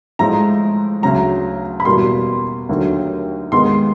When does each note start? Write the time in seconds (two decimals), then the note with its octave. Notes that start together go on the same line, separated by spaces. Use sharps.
0.19 A2 F3 G#3 A#5
1.02 D2 C#3 F#3 A#5
1.80 B5
1.85 E2 B2 G3 A#3 C6
2.69 D#2 D3 F#3 A3
3.52 D#2 D#3 G#3 B3 C6